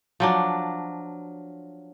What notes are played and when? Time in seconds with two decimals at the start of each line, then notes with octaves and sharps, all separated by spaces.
0.20 F3 F#3 D4